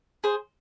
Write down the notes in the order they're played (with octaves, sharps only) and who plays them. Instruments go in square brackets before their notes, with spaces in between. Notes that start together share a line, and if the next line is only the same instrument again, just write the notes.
[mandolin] G#4 C5